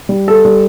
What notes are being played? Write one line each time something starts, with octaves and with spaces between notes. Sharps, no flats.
G3
A4
G3